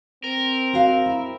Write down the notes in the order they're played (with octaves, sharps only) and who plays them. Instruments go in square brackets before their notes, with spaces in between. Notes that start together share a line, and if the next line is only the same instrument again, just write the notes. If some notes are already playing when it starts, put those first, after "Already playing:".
[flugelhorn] C4 [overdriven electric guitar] A#4
[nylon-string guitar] F#4 D#5 F5
E4